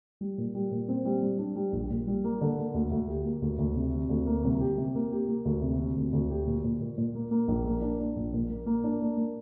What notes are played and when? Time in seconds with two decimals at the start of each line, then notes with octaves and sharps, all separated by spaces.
0.21 G3
0.38 A#2
0.55 G3
0.71 A#2
0.88 C4
1.05 G3
1.22 G3
1.39 D4
1.56 G3
1.73 A#1
1.90 A#2
2.07 G3
2.24 A#3
2.41 D3
2.58 A#3
2.74 D2
2.91 D2
3.08 G4
3.25 A#3
3.42 D2
3.59 D2
3.76 C3
3.93 C3
4.09 D2
4.26 A#3
4.44 C2
4.60 G4
4.78 C3
4.95 A#3
5.11 G4
5.28 A#3
5.45 D2
5.62 C3
5.79 C3
5.96 D2
6.13 D2
6.30 G4
6.47 A#2
6.64 A#2
6.81 A#2
6.98 A#2
7.15 A#3
7.31 A#3
7.48 A#1
7.65 A#3
7.82 D4
8.00 D4
8.16 A#1
8.33 A#2
8.50 A#3
8.66 A#3
8.84 D4
9.01 A#3
9.17 A#3